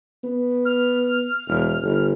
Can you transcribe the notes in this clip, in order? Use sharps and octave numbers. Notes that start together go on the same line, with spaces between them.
B3
F6
E1
G1